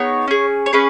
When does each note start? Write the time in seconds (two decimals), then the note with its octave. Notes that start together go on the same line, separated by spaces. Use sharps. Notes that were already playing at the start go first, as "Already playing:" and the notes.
Already playing: B3 D#4 G#4 C#5
0.28 C#4 G#4
0.66 C#5
0.73 C#4 G#4 B4